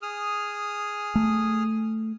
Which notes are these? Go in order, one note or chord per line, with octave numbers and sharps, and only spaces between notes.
G#4 D#6 F6
A3